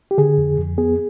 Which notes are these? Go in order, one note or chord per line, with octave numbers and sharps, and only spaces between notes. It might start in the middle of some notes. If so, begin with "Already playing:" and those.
G4
D3 G#4
F2
F2
B3 G#4